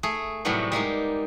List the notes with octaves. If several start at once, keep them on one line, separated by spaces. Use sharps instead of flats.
A3 G#4
A2 C3 F#3 G3 A3 B3
G3 G#3 A#3 D#4